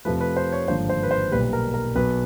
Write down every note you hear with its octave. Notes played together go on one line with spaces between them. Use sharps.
F2 C3 F3 A3 B4
B4
C5
C#5
G#1 G2 D3 F3 A#3 C5
C5
B4
C5
B1 A#2 G3 B4
A#4
A#4
B1 B2 F#3 B3 B4